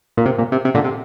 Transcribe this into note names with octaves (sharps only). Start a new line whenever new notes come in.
A#2
C3
A#2
C3
C3
A#2 D3
C3